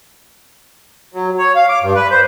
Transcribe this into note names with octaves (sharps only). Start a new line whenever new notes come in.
F#3
C#5
F5
D6
G2
B4
C5